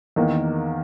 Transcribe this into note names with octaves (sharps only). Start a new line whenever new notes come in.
E2 D#3 A#3